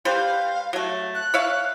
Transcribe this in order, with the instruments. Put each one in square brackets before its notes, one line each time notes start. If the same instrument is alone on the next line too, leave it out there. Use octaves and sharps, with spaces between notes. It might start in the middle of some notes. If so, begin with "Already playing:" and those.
[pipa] G3 B4 C5 [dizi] F5
[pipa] F#3 A3
[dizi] F#6
[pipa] C#5 E5 F5